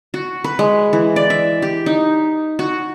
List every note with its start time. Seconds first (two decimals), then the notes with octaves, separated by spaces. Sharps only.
0.14 F#4
0.44 B4
0.59 G#3
0.93 E3
1.16 D5
1.30 E5
1.62 G4
1.86 D#4
2.59 F#4